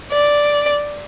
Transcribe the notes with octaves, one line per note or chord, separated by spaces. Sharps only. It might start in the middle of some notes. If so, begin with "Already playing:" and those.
D5